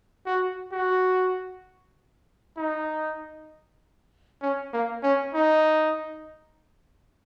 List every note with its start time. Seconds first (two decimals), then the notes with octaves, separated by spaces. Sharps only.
0.26 F#4
0.72 F#4
2.58 D#4
4.42 C#4
4.73 A#3
5.03 C#4
5.34 D#4